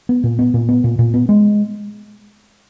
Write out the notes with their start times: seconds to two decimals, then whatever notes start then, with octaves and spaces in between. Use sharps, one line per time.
0.09 B3
0.24 A#2
0.39 B3
0.54 A#2
0.69 B3
0.84 A#2
0.99 A#2
1.14 B3
1.29 G#3